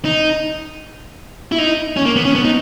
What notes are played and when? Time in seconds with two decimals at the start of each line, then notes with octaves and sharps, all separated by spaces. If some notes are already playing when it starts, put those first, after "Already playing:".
0.05 D#4
1.52 E4
1.58 D#4
1.97 C#4
2.06 A#3
2.16 B3
2.25 C#4
2.35 B3
2.44 D#4